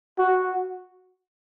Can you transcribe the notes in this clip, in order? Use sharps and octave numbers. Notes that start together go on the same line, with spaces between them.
F#4